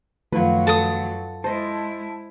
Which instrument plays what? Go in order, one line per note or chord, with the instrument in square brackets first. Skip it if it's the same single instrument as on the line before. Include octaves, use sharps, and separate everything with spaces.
[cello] F#2 F#3 [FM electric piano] D#3 F3 A3 [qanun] F4 B4
[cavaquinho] A4 D#6
[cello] G#3 E4 [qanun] C5 D#5 [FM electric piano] A5